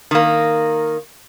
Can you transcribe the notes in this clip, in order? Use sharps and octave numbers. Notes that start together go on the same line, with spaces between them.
D#3 A#3